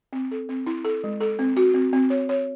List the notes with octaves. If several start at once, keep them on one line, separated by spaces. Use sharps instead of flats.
C4
A4
C4
E4
A4
G#3
A4
C4
F#4
C4
C4
C#5
C#5